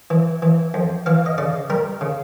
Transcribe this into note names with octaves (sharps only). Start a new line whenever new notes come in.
E3
E3
F2
E3 F5
D#5
C#3 D5
G3 A#4
C#3